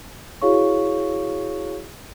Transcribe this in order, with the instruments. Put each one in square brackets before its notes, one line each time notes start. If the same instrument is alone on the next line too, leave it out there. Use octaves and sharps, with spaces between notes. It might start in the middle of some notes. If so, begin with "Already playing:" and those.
[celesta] E4 F#4 G#4 C#5 F5 C#6